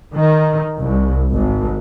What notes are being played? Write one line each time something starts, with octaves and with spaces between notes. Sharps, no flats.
D#3
C2
G#1